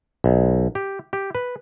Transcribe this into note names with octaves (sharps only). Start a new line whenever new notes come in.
B1
G4
G4
B4